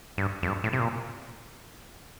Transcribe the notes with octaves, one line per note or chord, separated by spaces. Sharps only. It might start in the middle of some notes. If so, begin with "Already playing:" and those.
G2
F2
G2
A2
C3
A#2